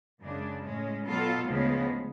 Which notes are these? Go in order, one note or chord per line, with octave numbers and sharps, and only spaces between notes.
F#2 C#3 G#3 D4
A2 G#3 C#4
B2 F#3 B3 F4 A4
D2 C#3 F3 G#3 B3